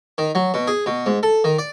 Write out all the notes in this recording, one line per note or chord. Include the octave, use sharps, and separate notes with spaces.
D#3
F#3
B2
G#4
B2
G#2
A4
D#3
D5